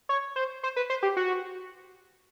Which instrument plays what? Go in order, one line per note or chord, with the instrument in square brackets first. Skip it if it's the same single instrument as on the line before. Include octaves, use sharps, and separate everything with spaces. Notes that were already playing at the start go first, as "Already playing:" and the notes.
[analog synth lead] C#5
C5
C5
B4
C5
G4
F#4